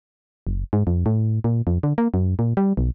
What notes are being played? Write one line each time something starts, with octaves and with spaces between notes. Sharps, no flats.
F#1
G#2
F2
A2
A#2
F2
D3
A#3
F#2
A#2
G3
B1